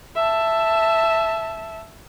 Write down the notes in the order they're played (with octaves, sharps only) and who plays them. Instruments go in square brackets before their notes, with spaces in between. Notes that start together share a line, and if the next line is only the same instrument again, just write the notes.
[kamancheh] E5 A5